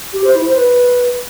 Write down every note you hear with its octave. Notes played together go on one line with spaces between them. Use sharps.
G4
C5
E4
C5
B4